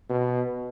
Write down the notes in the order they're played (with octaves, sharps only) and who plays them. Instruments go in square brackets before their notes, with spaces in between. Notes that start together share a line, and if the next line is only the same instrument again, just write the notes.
[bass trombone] B2